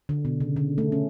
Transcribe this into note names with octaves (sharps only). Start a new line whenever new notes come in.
D3
B2
C#3
D3
A3
C#4